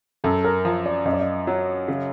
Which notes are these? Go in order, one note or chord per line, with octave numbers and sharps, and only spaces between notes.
F#2 A4
A#4
F3
D5
F#2 D#5
D5
D#5
F#3
C#3